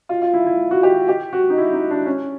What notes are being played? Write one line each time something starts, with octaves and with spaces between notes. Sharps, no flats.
F4
F4
E4
E4
F#4
G4
G4
F#4
D#4
E4
D#4
D4
C#4